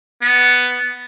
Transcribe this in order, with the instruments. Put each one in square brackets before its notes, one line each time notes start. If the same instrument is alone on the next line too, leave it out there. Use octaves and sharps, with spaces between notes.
[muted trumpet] B3